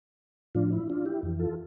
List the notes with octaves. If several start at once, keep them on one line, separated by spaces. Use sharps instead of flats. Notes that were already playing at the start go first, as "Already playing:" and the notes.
A2 F3 D4 F4
E4
D4 F4
E4 G4
F2 E3
F4 A4